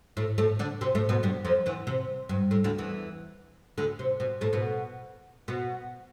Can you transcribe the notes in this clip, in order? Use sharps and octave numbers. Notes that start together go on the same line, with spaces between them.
A2 A3
A2 A3
D3 D4
C3 C4
A2 A3
B2 B3
G2 G3
F2 F3
E2 E3
C3
G2
A2
D2 D3
E2 E3
D2 D3
C3
B2
A2 A3
B2 B3
B2 B3